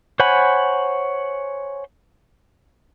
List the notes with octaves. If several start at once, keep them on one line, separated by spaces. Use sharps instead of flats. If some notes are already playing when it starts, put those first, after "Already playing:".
C5 C#5 F#5 G#5 B5